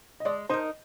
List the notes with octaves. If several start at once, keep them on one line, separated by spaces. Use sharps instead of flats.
D#5
G#3 D5
D#4 A#4 C5 D#5